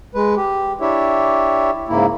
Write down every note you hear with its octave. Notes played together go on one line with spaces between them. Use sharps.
G#3 B4
G4
D4 E4 G4 C#5 E5
G#2 C#3 A#3 E4